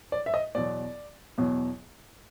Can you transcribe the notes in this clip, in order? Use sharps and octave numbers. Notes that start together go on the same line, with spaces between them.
D5
E5
D#5
E2 B2 F#3 D5
E2 B2 F#3